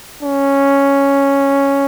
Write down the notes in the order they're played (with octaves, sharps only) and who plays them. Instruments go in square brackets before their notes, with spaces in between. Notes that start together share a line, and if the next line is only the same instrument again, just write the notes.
[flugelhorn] C#4